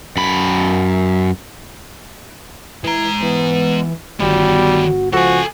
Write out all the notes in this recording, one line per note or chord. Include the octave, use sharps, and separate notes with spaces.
F#2 B5
E3 G#3 A#5
E3 B3
G1 D#3 G3 B3 F#4
C#2 F3 F#4 A4 G#5